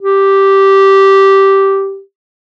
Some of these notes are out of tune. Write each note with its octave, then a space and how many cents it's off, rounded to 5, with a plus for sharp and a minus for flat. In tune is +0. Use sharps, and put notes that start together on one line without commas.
G4 -10